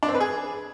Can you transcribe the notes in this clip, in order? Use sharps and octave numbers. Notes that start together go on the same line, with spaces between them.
D4
C4
B4
G#4